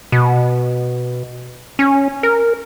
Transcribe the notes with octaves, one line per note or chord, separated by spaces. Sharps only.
B2
C#4
A#4